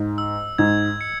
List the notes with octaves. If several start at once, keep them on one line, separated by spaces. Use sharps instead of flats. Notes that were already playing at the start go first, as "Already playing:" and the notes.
Already playing: G#2
E6
G#2 G#6
C#7